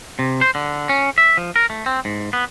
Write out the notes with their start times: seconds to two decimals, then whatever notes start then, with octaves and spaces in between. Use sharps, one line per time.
0.19 C3
0.41 C5
0.55 D3
0.89 C#4
1.18 E5
1.37 F3
1.56 A#4
1.70 A3
1.86 C4
2.05 G#2
2.33 B3